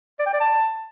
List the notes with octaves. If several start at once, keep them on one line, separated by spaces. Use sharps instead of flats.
D5
G5
D5
A5